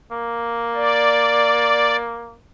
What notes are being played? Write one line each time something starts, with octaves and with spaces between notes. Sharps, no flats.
A#3
D5